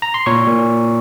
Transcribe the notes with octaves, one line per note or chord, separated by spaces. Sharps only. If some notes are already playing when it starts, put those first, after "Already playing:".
A#5
C6
A#2 C#5 C#6
A#2